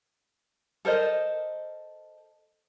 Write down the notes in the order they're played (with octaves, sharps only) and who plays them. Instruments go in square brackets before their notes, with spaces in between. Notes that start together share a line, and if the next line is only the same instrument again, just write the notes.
[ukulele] A4 A#4 C5 D#5